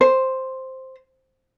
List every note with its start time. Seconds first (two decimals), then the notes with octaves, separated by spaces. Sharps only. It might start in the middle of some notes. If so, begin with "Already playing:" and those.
0.01 C5